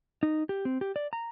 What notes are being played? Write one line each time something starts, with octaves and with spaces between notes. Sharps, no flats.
D#4
G4
C4
G4
D5
A#5